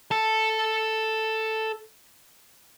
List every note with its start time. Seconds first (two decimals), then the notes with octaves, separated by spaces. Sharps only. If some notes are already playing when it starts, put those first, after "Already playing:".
0.11 A4 A5